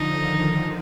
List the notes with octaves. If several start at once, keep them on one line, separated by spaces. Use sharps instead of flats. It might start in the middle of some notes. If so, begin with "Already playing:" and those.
Already playing: D3 F3 D#4
D#3